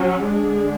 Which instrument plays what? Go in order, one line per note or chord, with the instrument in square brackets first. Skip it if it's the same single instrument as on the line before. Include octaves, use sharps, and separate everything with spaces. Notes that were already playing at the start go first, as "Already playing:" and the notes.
Already playing: [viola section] F#3 C#4
D3 G#3 D4 G#4